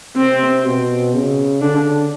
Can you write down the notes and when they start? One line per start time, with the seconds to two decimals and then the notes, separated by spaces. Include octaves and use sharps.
0.16 C3 C4
0.65 B2
1.14 C#3
1.61 D3 D4